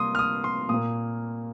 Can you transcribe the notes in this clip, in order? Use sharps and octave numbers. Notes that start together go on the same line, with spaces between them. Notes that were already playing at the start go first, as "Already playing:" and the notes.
Already playing: C3 G3 A#3 C6 D#6
F6
D#6
C6
A#2 A#3 D#6